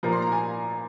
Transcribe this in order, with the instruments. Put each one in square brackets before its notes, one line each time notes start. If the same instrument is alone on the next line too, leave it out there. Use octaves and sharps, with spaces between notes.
[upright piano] A#2 F3 A#3 A#5
C6
A#5
G#5